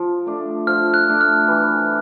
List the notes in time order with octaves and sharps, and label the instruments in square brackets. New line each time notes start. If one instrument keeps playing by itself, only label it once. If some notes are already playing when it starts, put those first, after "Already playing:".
Already playing: [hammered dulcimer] F3
A3 D4
[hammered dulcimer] F3 [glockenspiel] F6
[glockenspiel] F#6
[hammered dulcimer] A3 D4
[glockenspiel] F6
[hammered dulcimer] E3